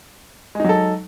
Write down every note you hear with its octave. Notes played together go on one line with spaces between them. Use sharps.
F#3 G#3 D#4 A4